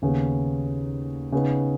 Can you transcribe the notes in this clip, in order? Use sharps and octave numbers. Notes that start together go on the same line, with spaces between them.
D#2 C#3 B3
C#3 B3 D#4